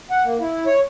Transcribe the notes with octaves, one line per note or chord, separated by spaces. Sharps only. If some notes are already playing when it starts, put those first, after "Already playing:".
F#5
A#3
E4
C#5